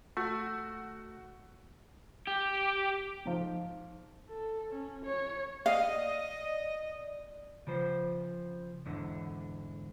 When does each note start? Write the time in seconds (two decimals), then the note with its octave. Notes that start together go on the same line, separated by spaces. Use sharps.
0.17 A3 F#4
2.27 G4
3.25 G#2 F3
4.29 A4
4.70 C#4
5.05 C#5
5.66 D5 D#5 F5
7.67 C#3 F3 C5
8.86 E2 G#2 D3